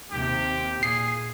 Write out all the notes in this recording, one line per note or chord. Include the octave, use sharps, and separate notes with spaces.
D#2 C3 G4
A#2 G#4 C7